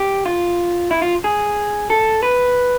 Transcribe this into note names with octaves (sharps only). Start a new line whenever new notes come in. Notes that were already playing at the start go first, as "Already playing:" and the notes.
Already playing: G4
F4
E4
F4
G#4
A4
B4